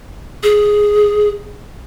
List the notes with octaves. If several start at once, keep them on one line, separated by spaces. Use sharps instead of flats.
G#4